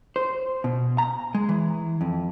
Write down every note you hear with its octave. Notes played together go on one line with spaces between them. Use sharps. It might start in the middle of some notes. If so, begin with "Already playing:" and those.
C5
B2
A#5
G#3
E3
F2